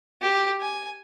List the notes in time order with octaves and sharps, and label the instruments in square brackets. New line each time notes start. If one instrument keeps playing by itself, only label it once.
[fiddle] G4
G#5